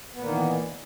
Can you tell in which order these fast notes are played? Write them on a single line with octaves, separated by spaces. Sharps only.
B3 A#2 A#3 D#3 E3